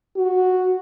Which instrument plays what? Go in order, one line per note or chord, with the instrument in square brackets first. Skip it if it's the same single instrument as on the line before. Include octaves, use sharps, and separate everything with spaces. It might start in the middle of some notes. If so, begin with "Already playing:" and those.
[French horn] F#4